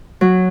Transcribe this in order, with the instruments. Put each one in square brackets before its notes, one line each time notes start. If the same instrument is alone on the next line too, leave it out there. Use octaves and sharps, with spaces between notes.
[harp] F#3